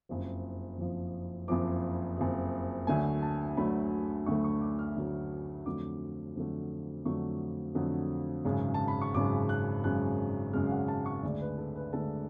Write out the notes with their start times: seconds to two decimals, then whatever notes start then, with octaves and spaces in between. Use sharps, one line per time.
0.09 F#1 F2 F3
0.79 F#1 F2 F3
1.48 F#1 F2 F3 D6
2.18 F#1 F2 F3
2.87 D2 D3 F#3 A3 G#5
3.22 A5
3.57 D2 D3 F#3 A3 B5
4.26 D2 D3 F#3 A3 C#6
4.44 C#6
4.61 D6
4.79 F6
4.96 D2 D3 F#3 A3
5.66 F2 D3 F#3 A3 D6
6.36 F2 D3 F#3 A3
7.05 F2 D3 F#3 A3 C#6
7.75 F2 D3 F#3 A3
8.45 G#1 F#2 C#3 G#3
8.74 A5
8.88 B5
9.01 C#6
9.14 G#1 F#2 C#3 G#3 D6
9.49 F#6
9.84 G#1 F#2 C#3 G#3 F#6
10.53 G#1 F#2 C#3 G#3 F6
10.66 F5
10.71 F#5
10.88 A5
11.06 C#6
11.23 D2 D3 G#3 D5
11.41 B4
11.58 A4
11.76 B4
11.93 D2 D3 G#3 A4